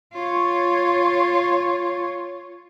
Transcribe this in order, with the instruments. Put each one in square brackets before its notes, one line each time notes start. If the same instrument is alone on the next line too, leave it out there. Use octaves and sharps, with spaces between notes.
[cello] F4 C#5